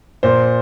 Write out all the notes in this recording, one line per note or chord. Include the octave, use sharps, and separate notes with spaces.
A#2 C5